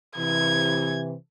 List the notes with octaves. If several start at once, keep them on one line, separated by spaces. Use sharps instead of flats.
C3 E3 G#6